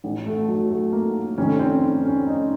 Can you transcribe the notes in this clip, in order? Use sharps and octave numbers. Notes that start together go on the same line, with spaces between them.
A1 A2
A3
F#3
A3
A#3
F1 F2 D#3 C#4
C4
C#4
D#4